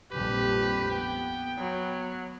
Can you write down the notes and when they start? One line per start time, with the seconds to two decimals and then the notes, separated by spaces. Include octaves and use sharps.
0.11 A#1 F2 G3 G4 B4
0.91 B3 G5
1.58 F#3